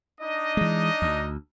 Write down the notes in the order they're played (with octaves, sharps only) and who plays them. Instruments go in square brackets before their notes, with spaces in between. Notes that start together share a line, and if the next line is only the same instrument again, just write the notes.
[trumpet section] D4 D#4 D#5
[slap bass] E3 G#3
D2